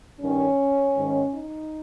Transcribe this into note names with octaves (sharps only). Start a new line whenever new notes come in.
G2 D#3 C#4
G#2 D#3
D#4